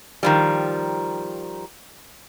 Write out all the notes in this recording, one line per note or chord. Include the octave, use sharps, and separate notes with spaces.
D#3 F3 G3